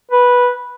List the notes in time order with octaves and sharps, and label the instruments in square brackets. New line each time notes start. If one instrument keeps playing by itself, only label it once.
[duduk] B4